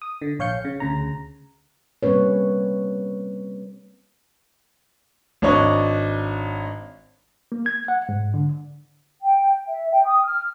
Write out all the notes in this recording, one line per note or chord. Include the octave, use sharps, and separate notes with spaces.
D#6
D3
A#1 C#5 F5 G6 C#7
C#3
D2 C#3 A#5
G3 A#3 C4 C#4 B4 C#5
G#1 D4 C#5 D#5
A#3
G#6
F#5
G#2
D3
G5
E5
G5
D#6
F6